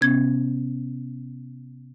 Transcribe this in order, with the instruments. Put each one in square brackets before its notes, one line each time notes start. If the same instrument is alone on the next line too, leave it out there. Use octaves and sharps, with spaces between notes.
[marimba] C3 B3 C#4 G#6